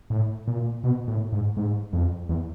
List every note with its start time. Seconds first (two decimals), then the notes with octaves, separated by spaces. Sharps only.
0.10 A2
0.48 A#2
0.84 B2
1.08 A2
1.32 G#2
1.57 G#2
1.93 F2
2.29 E2